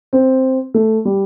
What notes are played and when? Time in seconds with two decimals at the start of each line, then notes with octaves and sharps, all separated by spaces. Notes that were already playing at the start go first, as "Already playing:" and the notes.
0.13 C4
0.74 A3
1.05 G3